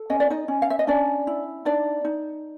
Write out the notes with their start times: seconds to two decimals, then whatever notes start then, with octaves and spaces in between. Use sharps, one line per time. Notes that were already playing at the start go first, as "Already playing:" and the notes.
Already playing: A4
0.10 C#4 D#5
0.20 D5
0.30 D#4 D#5
0.48 C#4
0.62 F5
0.70 E5
0.79 D#5
0.87 C#4 D4 D5
1.27 E4
1.65 D4 D#4 D5
2.05 D#4